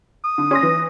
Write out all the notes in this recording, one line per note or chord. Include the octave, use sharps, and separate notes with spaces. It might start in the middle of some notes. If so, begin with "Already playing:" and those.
D#6
D3
C#4 C6 A#6
E3